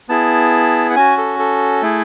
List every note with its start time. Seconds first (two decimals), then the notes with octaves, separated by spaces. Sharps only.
0.09 B3 E4 G#4 A5
0.90 F#5
0.96 C#4 F#4 G#5
1.18 A4
1.39 A4
1.82 A3 E4 G#4